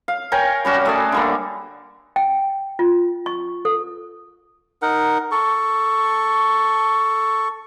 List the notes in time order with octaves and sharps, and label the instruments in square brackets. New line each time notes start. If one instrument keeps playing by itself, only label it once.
[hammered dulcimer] F5
A#4 C#5 G5 G#5
G3 C#4 F#4
A3 G#4 D5
D3 G3 A#3
[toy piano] G5
F4
C#6
A4
[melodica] D#4 A#4 F#5
A4 C#6